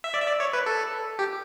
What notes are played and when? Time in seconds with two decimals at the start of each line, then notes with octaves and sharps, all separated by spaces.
0.04 E5
0.14 D5
0.22 E5
0.27 D5
0.40 C#5
0.53 B4
0.66 A4
1.19 G4